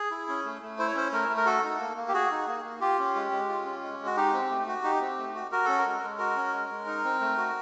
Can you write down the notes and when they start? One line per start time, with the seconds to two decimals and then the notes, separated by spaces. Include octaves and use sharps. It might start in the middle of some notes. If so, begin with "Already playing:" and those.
Already playing: G#4
0.11 E4
0.28 C#4
0.44 A3
0.62 A3
0.78 E4 C5
0.87 C#5
0.95 C#4 C5
1.12 A3 A#4
1.29 A3
1.37 A#4
1.46 F#4 A4
1.63 D#4
1.79 A#3
1.97 A#3
2.08 G4
2.14 F#4 G#4
2.31 D#4
2.47 A#3
2.64 A#3
2.81 F4 G4
2.99 C#4
3.15 G#3
3.32 G#3
3.49 F4
3.66 C#4
3.83 G#3
3.99 G#3
4.06 F#4
4.16 D#4 G4
4.33 C4
4.50 A3
4.67 F#4
4.83 D#4 G4
5.01 C4
5.18 A3
5.35 F#4
5.51 F#4 A#4
5.65 C#4 A4
5.78 A#4
5.85 G#3
6.03 G#3
6.18 F#4 A#4
6.36 C#4
6.53 G#3
6.70 G#3
6.86 D#4
7.04 C4
7.21 A3
7.37 F#4